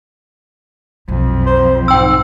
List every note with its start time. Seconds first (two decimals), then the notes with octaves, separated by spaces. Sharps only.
1.08 B1 F2
1.46 C5
1.88 G#2 G5 E6